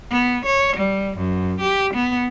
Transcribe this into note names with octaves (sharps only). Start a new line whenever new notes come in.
B3
C#5
G3
F#2
G4
B3